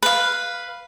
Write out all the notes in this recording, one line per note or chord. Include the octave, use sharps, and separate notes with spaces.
B4 F5